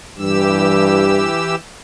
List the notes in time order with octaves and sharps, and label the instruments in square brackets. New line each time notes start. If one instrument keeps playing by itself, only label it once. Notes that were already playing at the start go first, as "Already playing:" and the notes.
[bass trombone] G2 [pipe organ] E3 G4 E6